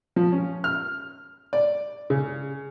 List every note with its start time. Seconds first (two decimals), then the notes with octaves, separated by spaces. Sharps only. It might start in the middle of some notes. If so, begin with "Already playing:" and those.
0.16 F3
0.32 C#4
0.64 F6
1.53 D5
2.10 C#3